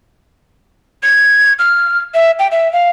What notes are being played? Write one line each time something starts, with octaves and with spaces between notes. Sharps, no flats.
G#6
F6
E5
G5
E5
F5